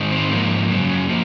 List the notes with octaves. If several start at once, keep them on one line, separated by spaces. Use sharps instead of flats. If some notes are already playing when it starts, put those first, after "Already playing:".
Already playing: G#2 D#3
C4
G#2 F3 A#3
F#2 C#3 F#3
F3